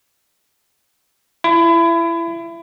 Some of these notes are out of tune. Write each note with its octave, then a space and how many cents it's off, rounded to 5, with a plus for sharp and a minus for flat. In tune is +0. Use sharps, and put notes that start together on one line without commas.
E4 +25